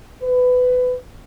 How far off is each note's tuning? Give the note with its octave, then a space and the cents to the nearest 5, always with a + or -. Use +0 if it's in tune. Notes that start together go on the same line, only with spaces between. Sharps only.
B4 +20